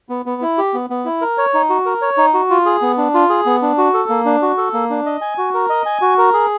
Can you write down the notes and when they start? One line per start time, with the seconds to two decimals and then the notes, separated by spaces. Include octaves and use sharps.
0.09 B3
0.26 B3
0.42 E4
0.58 G4
0.74 B3
0.90 B3
1.05 E4
1.21 A#4
1.38 C#5
1.54 D#4
1.69 F#4
1.86 A#4
2.02 C#5
2.17 D#4
2.34 F#4
2.50 F4
2.66 G#4
2.82 B3
2.98 D4
3.14 F4
3.30 G#4
3.46 B3
3.62 D4
3.78 F#4
3.94 A4
4.09 A#3
4.25 D4
4.42 F#4
4.58 A4
4.74 A#3
4.90 D4
5.06 D#5
5.21 G#5
5.38 F#4
5.54 A#4
5.70 D#5
5.86 G#5
6.02 F#4
6.18 A#4
6.34 G#4